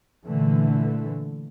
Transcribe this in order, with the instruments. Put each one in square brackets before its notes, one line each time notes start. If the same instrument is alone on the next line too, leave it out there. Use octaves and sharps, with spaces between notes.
[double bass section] A#2 D3 E3 A3